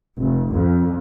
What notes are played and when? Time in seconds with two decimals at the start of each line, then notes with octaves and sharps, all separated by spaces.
0.18 F1
0.52 F2